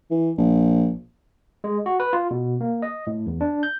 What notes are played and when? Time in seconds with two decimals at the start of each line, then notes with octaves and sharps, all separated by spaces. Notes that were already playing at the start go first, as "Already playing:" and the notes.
0.11 E3
0.38 A#1
1.64 G#3
1.86 F#4
2.00 B4
2.13 F4
2.31 B2
2.61 A#3
2.82 D#5
3.07 A2
3.26 E2
3.41 D4
3.63 G6